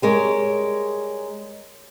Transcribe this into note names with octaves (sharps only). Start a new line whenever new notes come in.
G3 G#3 A#4 C#5